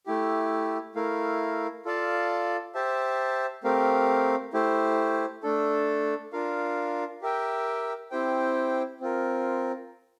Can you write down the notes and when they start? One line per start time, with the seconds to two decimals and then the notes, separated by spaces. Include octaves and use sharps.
0.06 A3 E4 G4
0.95 A3 E4 A#4 F5
1.85 F4 A4 D5 F5 A5
2.75 G4 C5 E5 A5
3.64 A3 C4 G4 A#4 F5
4.53 A3 E4 G4 C5
5.43 A3 D4 A4
6.33 D4 F4 A#4 F5
7.22 G4 A#4 E5 G5
8.11 C4 E4 G4 C5 G5
9.00 C4 F4 A#4